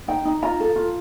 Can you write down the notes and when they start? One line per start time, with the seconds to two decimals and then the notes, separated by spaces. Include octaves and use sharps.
0.08 D#4 G5
0.25 D#4
0.42 F4 A#5
0.60 A4
0.76 F4